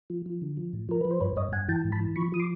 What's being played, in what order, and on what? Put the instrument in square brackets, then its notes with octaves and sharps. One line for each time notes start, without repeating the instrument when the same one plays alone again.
[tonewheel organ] F3
F3
D3
F3
A2
F3 A#4
F3 B4
C5
G2 B4 C#5
G2 C#5 D#5
G2 F#5 G#5
E3 G5 A5
G#2
A5 B5
E3
F3 B5 C#6
F3 D#6
C6 D6